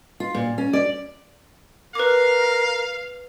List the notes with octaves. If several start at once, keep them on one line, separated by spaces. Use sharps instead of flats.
F4
A#2
C#4
D5
A#4 B4 F5 D6